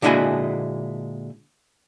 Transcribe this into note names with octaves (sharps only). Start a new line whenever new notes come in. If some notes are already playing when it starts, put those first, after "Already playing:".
A#2 D3 G#3 E4 F#4 G#5